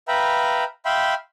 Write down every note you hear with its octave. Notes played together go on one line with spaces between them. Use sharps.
B4 E5 F5 G5 A#5 B5
E5 F5 G5 B5 C6